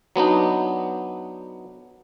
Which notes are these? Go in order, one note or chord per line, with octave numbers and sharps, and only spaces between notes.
F#3 B3 D4 D#4